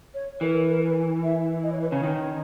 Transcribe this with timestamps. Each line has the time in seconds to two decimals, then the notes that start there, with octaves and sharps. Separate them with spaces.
0.14 C#5
0.41 E3 A#4
0.70 A#4
0.81 B4
1.23 E5
1.63 D#5
1.72 C#5
1.82 B4
1.91 C#3 C#5
2.03 D#3